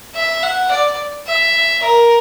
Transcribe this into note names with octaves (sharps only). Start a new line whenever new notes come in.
E5
F#5
D5
E5
A#4